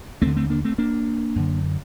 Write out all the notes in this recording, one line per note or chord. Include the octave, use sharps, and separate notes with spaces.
D#2 D3 A3 C4
A3 C4
A#3 D4
A3 C4
A#3 D4
F#2 D3